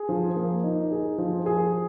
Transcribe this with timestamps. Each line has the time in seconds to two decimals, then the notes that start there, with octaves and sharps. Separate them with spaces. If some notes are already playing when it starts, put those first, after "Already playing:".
Already playing: G#4
0.09 F3
0.36 A#3
0.64 D#4
0.92 G#4
1.18 F3
1.46 G#4